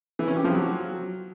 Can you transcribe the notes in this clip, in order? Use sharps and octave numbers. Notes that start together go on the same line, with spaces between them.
E3
C#4
G4
F3
F#3